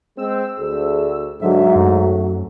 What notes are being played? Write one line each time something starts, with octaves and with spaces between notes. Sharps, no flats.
G#3 C4 E6
D2 G#4
G#2 D3 F#3 E5
F#2 A3